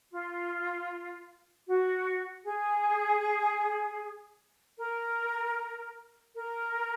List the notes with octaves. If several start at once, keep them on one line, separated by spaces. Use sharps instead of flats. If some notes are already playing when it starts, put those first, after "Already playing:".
F4
F#4
G#4
A#4
A#4